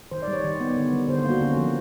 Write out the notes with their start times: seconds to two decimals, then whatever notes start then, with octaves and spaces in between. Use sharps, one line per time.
0.11 D#3 C5
0.22 D5
0.28 G3
0.33 C#5
0.44 D#3
0.60 B3
0.76 D3
0.92 G3
1.09 D3 C5
1.19 C5
1.25 A#3
1.30 F#4
1.41 D3 C#4
1.57 F3